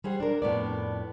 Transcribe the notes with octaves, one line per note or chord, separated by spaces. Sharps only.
G3 G#4 C5 F#5
D4 A#4
F2 A2 B3 D5